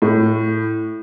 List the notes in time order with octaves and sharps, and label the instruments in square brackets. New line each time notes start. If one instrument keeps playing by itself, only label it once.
[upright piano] A2